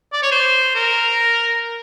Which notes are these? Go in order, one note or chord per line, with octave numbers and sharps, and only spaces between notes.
D5
C#5
C5
A#4